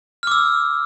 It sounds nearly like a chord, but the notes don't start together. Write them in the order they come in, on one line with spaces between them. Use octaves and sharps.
F6 D6 E6